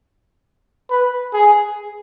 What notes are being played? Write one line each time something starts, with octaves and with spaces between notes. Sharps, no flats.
B4
G#4